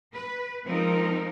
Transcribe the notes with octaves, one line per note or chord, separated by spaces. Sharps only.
B4
D#3 F3 G#3 C4 D#4 A#4